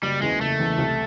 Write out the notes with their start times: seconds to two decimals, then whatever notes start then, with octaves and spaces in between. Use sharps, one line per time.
0.02 F#1 G3
0.22 E2 C#3 E3 G#3
0.40 F#1 A3
0.59 E2 C#3 E3
0.78 C2